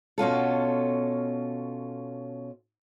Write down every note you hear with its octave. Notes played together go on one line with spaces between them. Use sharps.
B2 C#4 F4 A4